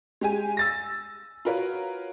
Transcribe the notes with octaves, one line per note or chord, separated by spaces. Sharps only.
G#3 G4 G#5
E6 A6 A#6
F4 F#4 A#4 B4 C#5